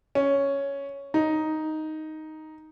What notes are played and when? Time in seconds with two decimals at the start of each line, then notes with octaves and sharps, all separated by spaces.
0.15 C#4
1.14 D#4